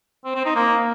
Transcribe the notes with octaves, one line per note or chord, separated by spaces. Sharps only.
C4
C4
D#4
A#3